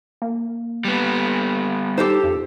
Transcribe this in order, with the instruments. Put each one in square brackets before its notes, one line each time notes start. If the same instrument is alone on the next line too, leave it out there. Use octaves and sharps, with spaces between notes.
[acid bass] A#3
[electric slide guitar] G3 B3
[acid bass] D#4 [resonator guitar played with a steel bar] G4 A4 C5
[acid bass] F2